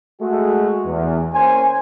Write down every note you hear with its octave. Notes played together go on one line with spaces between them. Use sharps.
G#3 A3 F#4
E2
A#3 C#4 C5 G#5